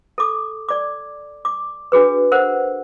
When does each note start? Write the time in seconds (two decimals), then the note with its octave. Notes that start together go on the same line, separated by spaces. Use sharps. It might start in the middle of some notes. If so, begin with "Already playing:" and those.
0.18 A4 D6
0.69 D5 D6
1.45 D6
1.92 D4 F#4 G#4 B4
2.32 A#4 C5 F#5